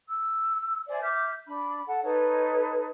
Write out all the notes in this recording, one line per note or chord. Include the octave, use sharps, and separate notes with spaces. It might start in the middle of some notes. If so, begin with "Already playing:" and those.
E6
C5 D5 E5 G#5
E5 D6 F6 G6
D4 B5
A4 F#5
D#4 A4 B4 C#5